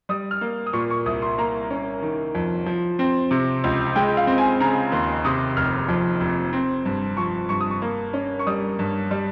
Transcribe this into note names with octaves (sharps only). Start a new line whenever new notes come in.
G3 D#6
F6
A#3
D#6
A#2 C#6
C#6
C2 D#6
C6
A#3 A#5
C#4
D#3
F2
F3
C4
C3
C#2
G#3 G5
F5
C4
G#5
C#3 A#5
D#2 C6
C3 D#6
F1 F6
F2
F1
C4
G2
F3 C#6
G2 C#6
D#6
C#6
A#3
C#4
C#6
G3 D#6
G2
G3